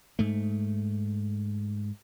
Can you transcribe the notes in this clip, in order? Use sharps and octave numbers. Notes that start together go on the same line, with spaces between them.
G#2 A3